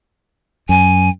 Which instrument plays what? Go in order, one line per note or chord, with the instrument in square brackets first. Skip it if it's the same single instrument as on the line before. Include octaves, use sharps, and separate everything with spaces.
[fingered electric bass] F#2 [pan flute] G#5